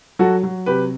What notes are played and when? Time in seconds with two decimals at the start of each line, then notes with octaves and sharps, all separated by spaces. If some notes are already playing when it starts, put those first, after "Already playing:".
0.19 F#3 F#4 A4
0.43 F#3
0.66 C3 G4 B4